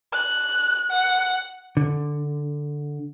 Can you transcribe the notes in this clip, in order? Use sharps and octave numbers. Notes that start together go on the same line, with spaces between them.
F#6
F#5
D3